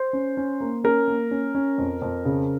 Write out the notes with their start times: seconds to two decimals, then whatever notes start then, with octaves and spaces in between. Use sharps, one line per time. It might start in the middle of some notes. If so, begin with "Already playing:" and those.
Already playing: C5
0.13 C#4
0.37 C#4
0.61 A#3
0.84 C#4 A#4
1.08 A#3
1.31 C#4
1.55 C#4
1.78 F2
2.02 F2
2.25 C#3